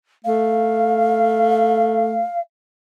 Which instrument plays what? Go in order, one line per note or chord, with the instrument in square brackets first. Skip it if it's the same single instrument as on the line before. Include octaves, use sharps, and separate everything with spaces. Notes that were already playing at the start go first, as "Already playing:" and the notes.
[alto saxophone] A3 [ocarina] F5